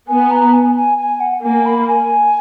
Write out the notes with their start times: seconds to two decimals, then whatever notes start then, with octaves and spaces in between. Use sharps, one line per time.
0.08 B3 G#5
0.31 A#5
0.53 G#5
0.76 G#5
0.98 G#5
1.20 F#5
1.43 A#3 G#5
1.65 B5
1.88 G#5